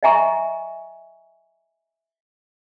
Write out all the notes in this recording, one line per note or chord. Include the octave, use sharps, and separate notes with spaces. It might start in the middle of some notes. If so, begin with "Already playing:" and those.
D#5 E5 G#5 A#5 C#6